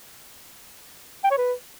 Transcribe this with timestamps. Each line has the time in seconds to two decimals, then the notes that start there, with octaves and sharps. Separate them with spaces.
1.24 G5
1.31 C#5
1.38 B4